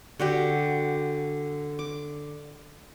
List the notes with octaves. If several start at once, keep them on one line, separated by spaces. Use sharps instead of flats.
D3 F#4 G4
D6